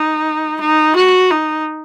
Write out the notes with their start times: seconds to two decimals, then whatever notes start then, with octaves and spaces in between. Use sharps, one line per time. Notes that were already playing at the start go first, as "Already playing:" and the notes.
Already playing: D#4
0.61 D#4
0.96 F#4
1.31 D#4